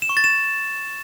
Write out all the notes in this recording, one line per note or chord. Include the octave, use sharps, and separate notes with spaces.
E7
C#6
A6
E7